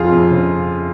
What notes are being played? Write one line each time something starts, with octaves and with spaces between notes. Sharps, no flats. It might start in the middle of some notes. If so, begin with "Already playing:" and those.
Already playing: F2 F4 G#4
F2
C#3